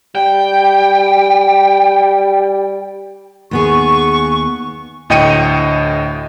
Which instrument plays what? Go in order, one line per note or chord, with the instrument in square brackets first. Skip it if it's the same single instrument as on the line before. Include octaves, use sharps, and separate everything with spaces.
[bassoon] G3 [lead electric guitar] G5
[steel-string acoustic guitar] D#2 B3 G#4 [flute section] C#6
[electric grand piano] D2 A2 D#5 G5 C#7 D#7